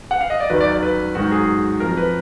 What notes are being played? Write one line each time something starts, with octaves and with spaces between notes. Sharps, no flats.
F#5
F5
D#5
D5
D#2 D#3 F#3 B4
D5
D5
B4
G#2 D#3 F#3 F#4
G#4
F2 F3 A#4
B4